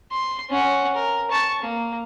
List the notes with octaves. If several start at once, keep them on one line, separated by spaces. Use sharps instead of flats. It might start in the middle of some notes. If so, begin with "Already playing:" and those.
C6
C#4 F#5
A#4
A5 C#6
A#3